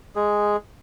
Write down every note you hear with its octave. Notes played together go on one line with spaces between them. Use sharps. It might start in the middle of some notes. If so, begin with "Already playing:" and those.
G#3 G#4